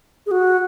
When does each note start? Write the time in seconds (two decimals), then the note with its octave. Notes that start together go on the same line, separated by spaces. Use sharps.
0.26 G#4
0.31 F#4